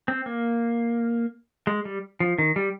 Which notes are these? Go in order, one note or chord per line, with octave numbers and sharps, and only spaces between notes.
C4
A#3
G#3
G3
F3
D#3
G3